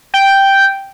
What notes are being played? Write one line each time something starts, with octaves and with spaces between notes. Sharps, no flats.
G5